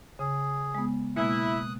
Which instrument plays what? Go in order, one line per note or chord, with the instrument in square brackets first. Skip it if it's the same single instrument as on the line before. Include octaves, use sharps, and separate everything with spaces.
[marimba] C#3 [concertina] G#4
[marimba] G#3 B3
[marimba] B2 G#3 A#3 [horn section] E4 [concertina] D#6 F#6